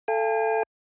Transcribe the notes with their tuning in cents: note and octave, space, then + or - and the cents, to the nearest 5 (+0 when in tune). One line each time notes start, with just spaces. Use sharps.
A4 +5 F5 -40 G#5 -45